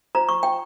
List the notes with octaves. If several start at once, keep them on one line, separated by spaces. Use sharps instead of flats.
F4 C5 A#5
C#6
G5